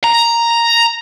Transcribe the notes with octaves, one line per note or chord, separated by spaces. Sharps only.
A#5